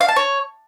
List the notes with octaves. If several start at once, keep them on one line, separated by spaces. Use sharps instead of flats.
F5
A5
C#5